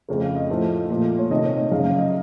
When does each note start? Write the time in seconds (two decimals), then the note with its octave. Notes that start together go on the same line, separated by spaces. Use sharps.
0.09 F2 C#3 A3
0.21 F5
0.36 D#5
0.50 A2 F3 A3
0.90 A#2 F3 A3
1.18 C#5
1.31 C3 D#3 A3 D#5
1.45 C#5
1.57 D#5
1.71 F#2 C#3 F#3 F5
1.85 F5
1.98 D#5